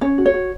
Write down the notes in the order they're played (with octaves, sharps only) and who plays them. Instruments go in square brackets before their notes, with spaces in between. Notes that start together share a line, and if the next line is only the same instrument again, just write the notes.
[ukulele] C#4 C#5
F#4
C#5
F#4